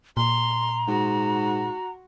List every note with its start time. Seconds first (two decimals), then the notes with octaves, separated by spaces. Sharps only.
0.17 A#2 A#5 C6
0.88 G#2 F#4